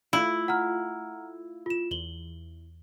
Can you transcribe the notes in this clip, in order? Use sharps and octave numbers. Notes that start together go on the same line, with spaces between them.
A3 E4 F4
F#5 A#5 F6
F4 E7
E2 F#7 G7